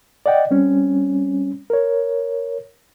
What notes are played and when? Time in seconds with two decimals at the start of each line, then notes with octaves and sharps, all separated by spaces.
0.26 D5 D#5 F#5 G5
0.51 G3 C4 C#4
1.70 A#4 C#5